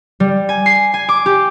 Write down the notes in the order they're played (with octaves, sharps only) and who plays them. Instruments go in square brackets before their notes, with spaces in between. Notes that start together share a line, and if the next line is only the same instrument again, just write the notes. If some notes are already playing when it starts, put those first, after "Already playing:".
[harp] G3
G#5
C7
G#5
D6
G4